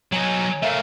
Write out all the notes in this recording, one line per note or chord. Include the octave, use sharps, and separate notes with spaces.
F#3 D#4 C#5 G#5 A#5
A3 A#4 E5 F5